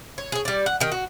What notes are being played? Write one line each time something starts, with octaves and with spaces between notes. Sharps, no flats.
C#5
G#4 C#5
G3 D5
F#5
D#3 G4
F#4